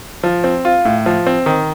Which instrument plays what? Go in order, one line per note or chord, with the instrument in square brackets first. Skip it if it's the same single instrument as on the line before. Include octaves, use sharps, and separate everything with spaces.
[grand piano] F3
C4
F4
A2
F3
C4
D#3